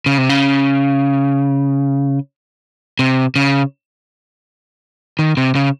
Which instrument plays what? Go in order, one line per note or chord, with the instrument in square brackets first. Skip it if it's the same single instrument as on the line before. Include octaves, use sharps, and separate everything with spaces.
[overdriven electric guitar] C#3
C3
C#3
C3
C#3
D#3
C3
C#3